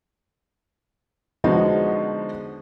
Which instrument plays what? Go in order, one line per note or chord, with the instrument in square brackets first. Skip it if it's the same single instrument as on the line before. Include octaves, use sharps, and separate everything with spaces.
[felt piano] D3 F3 G#3 B3 D#4 F#4